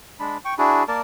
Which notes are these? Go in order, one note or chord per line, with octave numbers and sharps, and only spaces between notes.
G#3 D4 B5
G5 C#6
D4 E4 F#4 G#4
A#3 A#4 D5 A5